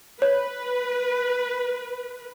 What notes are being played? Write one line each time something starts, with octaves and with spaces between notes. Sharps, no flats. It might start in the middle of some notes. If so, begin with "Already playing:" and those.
B4 C#5